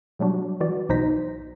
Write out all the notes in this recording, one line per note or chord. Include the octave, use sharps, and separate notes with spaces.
B2 F#3 G3 D4 F#4
E3 F#4 D5
B1 B2 D#4 C5 A#6 B6